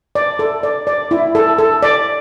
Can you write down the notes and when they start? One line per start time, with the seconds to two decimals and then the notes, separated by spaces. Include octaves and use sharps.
0.15 D5
0.39 A4
0.63 D5
0.87 D5
1.11 E4
1.35 A4
1.58 A4
1.83 D5